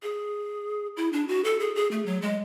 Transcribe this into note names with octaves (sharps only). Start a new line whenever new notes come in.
G#4
E4
D4
F#4
A4
G#4
G#4
A3
F#3
G#3